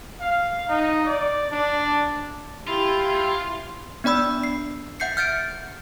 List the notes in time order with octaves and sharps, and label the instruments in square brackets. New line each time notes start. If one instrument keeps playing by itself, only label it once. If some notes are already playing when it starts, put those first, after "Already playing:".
[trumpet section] F5
D#4
D5
D4
[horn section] E4 [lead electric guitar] F4 [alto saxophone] G4 [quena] C6
[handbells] B3 D4 D5 B5 E6
C7
E5 F#5 G6 C7 C#7
F6 G6 A6 C#7 D7